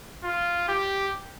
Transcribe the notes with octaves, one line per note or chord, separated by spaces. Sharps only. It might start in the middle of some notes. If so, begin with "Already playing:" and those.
F4
G4